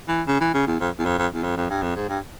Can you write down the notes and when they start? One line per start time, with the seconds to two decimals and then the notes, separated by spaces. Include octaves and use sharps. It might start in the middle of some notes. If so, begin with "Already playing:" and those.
0.08 E3
0.28 C#3
0.41 E3
0.54 C#3
0.67 E2
0.80 F2
0.99 E2
1.06 F2
1.18 F2
1.34 E2
1.44 F2
1.57 F2
1.70 G2
1.82 F2
1.96 G#2
2.09 G2